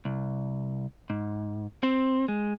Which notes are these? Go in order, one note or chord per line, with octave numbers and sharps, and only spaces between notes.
C2
G#2
C4
G#3